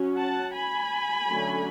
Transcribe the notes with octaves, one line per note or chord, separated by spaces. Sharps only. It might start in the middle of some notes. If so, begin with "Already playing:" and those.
Already playing: F#3 C#4
F#5 A5
G#5 B5
D3 F#3 A3 C#4